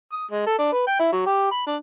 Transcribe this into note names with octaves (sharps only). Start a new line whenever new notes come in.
D#6
G#3
A4
D4
B4
G5
E4
F#3
G4
B5
D4